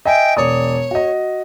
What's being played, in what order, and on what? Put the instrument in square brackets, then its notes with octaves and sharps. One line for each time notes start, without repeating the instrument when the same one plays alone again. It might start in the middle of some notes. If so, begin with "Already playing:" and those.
[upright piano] D#5 E5 G#5 [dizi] G5
[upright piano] E1 D5 D#6 [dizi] C#5
[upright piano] F#4 D#5